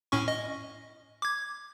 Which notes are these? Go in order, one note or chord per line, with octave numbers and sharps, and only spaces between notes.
A2 C#4 C#6
D#5
D6 G#6